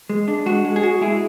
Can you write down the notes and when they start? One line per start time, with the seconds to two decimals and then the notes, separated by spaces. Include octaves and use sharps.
0.10 G#3
0.28 D4
0.46 G#3 F#4
0.65 G#3
0.76 G#4
0.83 G#3 F#4
1.01 G#3 E4 G#4